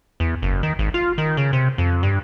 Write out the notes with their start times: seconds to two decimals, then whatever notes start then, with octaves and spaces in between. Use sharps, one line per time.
0.20 E2
0.42 F#1
0.63 D#3
0.79 G#1
0.94 F4
1.18 D#3
1.37 C#3
1.53 C3
1.78 F2
2.03 G2